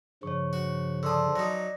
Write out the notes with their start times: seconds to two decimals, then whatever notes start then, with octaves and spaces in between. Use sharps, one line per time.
0.23 G2 C#3 F3 C#5 C#6
0.53 F#4
1.03 D3 A5 C6 D#6 E6
1.36 F#3 D#4 D5 A#6